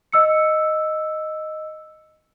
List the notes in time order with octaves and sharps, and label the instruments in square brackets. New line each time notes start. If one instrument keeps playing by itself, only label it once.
[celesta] D#5 E6 C#7